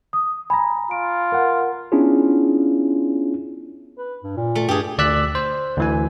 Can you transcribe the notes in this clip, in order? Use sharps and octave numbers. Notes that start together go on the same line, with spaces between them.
D#6
G#5 A#5 B5
F4 D7
A#4 F#5
B3 C#4 D4 E4 F4 G#4
B4
G2
A#2
A3
G2 G4 G#4
D2 D5 E6 F#6 B6
C5
D2 E3 G#5